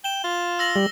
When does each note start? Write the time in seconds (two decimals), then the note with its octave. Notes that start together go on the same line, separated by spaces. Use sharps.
0.04 G5 E7 G7
0.24 F4
0.59 E6 A#6 F#7
0.76 G3